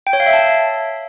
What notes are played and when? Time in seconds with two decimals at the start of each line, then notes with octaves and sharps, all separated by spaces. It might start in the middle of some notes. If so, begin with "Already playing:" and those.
0.07 G5
0.13 C#5
0.20 F5
0.26 E5
0.33 A5